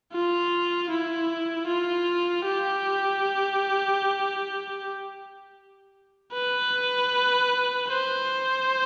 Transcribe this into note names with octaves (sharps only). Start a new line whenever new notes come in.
F4
E4
F4
G4
B4
C5